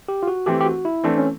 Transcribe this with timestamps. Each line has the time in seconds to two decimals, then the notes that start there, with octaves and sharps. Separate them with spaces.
0.08 G4
0.23 F4
0.28 F#4
0.46 E3 A3 C4 G4
0.61 G4
0.65 F#4
0.85 E4
1.04 E3 A3 C4 D4
1.18 C#4